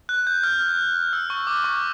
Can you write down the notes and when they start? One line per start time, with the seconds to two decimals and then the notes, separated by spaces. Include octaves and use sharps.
0.09 F#6
0.27 G6
0.43 F6
1.13 E6
1.30 C#6
1.47 D6
1.64 C#6